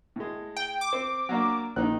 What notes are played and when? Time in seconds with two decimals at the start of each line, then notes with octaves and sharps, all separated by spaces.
0.16 A2 G#3
0.57 G5
0.81 D6
0.93 C4
1.29 F#3 A#3 D4
1.76 A#1 D#3 D#4 F#6